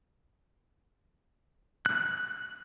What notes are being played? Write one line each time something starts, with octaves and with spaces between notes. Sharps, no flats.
F#6